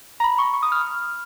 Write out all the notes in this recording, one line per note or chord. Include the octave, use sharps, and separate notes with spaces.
A#5
B5
C#6
C#6
D#6
F6